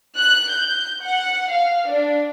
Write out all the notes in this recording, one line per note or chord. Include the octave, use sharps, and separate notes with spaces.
F#6
G6
F#5
F5
D4